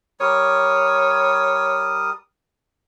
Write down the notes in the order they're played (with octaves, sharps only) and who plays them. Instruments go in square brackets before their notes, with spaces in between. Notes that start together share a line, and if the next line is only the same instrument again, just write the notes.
[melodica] G3 A#4 D#6 [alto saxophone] C#5